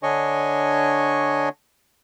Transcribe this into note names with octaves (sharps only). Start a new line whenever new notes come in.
D3 D4 C#5 D#5 G#5 C#6